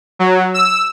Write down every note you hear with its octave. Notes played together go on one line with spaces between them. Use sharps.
F#3
E6